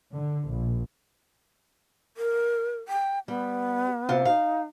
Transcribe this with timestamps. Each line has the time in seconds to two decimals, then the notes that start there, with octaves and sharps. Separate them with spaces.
0.13 D3
0.49 A#1
2.17 A#4
2.88 G5
3.28 G3 B3
4.09 C3 F4
4.25 D#4 F5